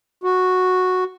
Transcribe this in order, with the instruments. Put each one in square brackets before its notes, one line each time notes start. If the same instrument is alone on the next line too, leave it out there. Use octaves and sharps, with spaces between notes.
[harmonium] F#4